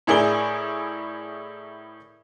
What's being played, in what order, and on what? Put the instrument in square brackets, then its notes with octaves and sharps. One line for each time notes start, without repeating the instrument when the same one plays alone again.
[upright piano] A2 E4 G#4 A#4 D5 G7